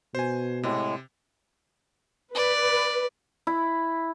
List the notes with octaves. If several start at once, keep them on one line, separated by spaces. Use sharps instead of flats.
B2 C5 G#5
A2 C3 G#3
B4 D5
E4